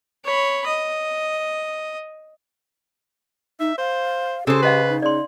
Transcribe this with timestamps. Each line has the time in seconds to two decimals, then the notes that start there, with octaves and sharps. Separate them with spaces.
0.25 C#5 B5
0.66 D#5
3.60 D#4 E5
3.78 C5 F5
4.47 C#3 G4 A4 C5
4.63 C#4 B4 D#5 F5
4.89 D#4
5.02 C#3 D5 C6